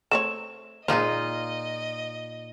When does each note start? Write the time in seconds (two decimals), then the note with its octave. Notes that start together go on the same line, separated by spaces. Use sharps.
0.11 A3 C4 C#5 E7
0.88 A#2 G#3 A#3 D#4 F4 C5 D#5